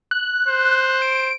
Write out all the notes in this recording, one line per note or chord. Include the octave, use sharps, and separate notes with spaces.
F#6
C5
D7